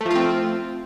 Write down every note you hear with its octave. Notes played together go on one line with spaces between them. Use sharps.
F3 A3 C4 F4